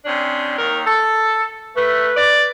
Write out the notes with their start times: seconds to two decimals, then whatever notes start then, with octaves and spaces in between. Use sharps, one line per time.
0.05 C3 C#4 D4
0.58 D#2 F#3 A#4
0.86 A4
1.76 A3 B4
2.16 D5